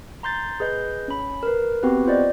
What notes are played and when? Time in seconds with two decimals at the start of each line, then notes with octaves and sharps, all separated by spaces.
0.23 A#5 C6 G6 A6
0.60 G#4 B4 D#5 G6
1.08 C#4 B5
1.43 A#4 B4
1.83 B3 C4 F#4 G4 B4
2.06 F4 C5 D5 D#5